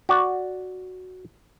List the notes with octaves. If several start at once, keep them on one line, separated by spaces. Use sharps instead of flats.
F#4 D5